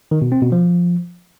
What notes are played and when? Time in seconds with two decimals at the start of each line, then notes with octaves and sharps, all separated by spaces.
0.11 D#3
0.22 B2
0.32 C4
0.42 B2
0.52 F3